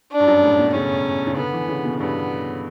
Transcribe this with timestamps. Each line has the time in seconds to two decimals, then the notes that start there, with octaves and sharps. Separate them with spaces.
0.12 D4
0.20 G2
0.27 F#2
0.43 A2
0.59 B2
0.74 C#3 C#4
1.27 C#3
1.37 D3 B3
1.53 E3
1.69 C#3
1.84 B2
2.00 G2 B3